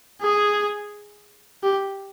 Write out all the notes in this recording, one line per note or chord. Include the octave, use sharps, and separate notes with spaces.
G#4
G4